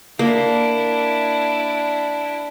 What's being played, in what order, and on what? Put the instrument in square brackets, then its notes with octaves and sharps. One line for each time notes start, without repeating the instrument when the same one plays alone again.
[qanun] A#3 [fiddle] D4 E4